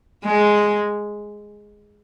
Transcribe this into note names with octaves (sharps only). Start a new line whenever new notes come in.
G#3